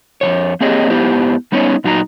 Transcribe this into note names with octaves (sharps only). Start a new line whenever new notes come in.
F2 B2 C#5
A#3 C4 G4 G#4 C#5 D#5
G#2 B3 E4 G4 C5
G3 B3 C#4 D#4 C#5
A#2 F#3 D#4 F#4 A#5